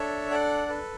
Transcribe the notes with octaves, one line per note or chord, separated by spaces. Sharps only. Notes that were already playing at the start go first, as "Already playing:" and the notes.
Already playing: D4 A4 C#5 E5
A4 D5 F#5
A4 B4